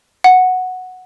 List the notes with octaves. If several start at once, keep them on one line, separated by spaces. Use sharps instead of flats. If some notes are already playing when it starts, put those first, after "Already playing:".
F#5